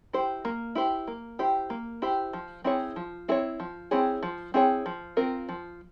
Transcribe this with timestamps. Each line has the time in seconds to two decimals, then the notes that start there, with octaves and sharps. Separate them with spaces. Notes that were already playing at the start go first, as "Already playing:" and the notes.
0.13 E4 G4 C5
0.45 A#3
0.75 E4 G4 C5
1.08 A#3
1.39 E4 G4 C5
1.70 A#3
2.02 E4 G4 C5
2.33 F3
2.64 C4 E4 G#4 C#5
2.96 F3
3.28 C4 E4 G#4 C#5
3.60 F3
3.91 C4 E4 G#4 C#5
4.23 F3
4.54 C4 E4 G#4 C#5
4.86 F3
5.17 C4 F4 A#4
5.49 F3